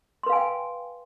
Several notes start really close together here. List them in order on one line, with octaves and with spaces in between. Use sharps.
C6 B4 F5 G#5 G5